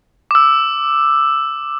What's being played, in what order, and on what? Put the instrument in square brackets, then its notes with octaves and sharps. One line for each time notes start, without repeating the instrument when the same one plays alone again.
[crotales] D6 E6